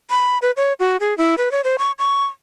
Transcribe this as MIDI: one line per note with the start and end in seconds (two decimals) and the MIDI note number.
0.10 0.38 83
0.42 0.51 71
0.57 0.73 73
0.80 0.97 66
1.00 1.16 68
1.18 1.35 64
1.38 1.51 71
1.52 1.61 73
1.64 1.76 72
1.78 1.92 85
1.99 2.24 85